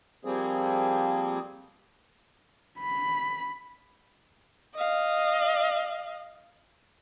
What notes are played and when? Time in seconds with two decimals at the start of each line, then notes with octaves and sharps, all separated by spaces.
0.25 F3 G3 A#3 C4 G#4
2.79 B5
4.75 D#5 F5